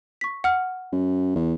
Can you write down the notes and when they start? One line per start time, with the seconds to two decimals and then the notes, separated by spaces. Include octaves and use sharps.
0.21 C#6 B6
0.44 F#5 F6
0.92 F#2
1.35 E2